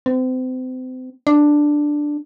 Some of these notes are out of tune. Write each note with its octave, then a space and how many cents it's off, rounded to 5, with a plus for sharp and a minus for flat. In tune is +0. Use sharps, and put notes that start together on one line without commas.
C4 -35
D4 +5